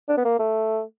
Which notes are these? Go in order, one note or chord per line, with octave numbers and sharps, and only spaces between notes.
D4
B3
A#3
A3